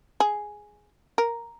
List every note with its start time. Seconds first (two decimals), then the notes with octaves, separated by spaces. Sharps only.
0.20 G#4
1.18 A#4